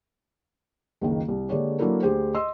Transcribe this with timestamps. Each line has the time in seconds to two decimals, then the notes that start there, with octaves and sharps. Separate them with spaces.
1.01 F#1 C#2 D#3
1.28 C2
1.49 D3 G#3 A#3 D4 G4 C#5
1.79 F#3 A#3 D4 E4 A4 A#4
2.02 D2 G4 G#4 C5
2.34 D#5 C6 E6